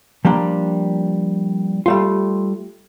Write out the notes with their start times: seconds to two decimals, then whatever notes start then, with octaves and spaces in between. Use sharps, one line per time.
0.25 F3 G3 A#3 D4
1.86 G3 A3 F4